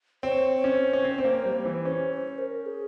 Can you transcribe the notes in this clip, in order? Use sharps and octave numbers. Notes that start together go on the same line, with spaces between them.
C4 C#5
C#5
C#4 C5
C#4
C4
C4
A#3
G3
E3
C#4 C5
C5
A#4
G#4